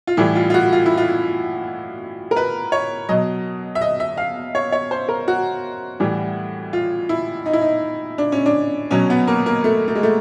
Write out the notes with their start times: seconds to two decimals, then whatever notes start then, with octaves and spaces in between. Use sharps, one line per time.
0.07 F4
0.17 A2 E3 G3 E4
0.35 F4
0.50 F4
0.54 F#4
0.73 F4
0.86 E4
0.97 F4
2.31 A#4
2.36 B4
2.72 C#5
3.09 B2 F#3 D#5
3.75 E5
3.81 D#5
4.00 E5
4.17 F5
4.55 C#5
4.72 C#5
4.91 C5
5.09 A#4
5.28 F#4
6.00 A2 E3 G3
6.73 F4
7.09 E4
7.46 D#4
7.53 E4
7.61 D#4
8.18 D4
8.32 C#4
8.46 D4
8.91 B2 F#3 C#4
9.10 B3
9.28 A#3
9.46 A#3
9.64 A3
9.88 A3
9.95 G#3
10.03 A3